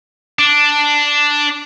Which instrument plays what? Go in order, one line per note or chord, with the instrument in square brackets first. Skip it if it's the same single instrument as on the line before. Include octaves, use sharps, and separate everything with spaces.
[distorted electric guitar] D4